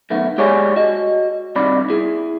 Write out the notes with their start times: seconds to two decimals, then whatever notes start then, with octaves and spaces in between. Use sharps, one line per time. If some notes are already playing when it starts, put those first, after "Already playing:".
0.10 F#2 D#3 A3 B3
0.38 G#3 G4 G#4 C#5 D5 G#5
0.76 F#4 D#5
1.56 G2 C3 D#3 D5 B5
1.90 E4 G#4